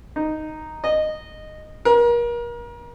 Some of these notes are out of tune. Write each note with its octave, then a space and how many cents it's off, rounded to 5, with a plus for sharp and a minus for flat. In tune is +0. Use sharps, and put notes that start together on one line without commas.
D#4 -5
D#5 -10
A#4 +35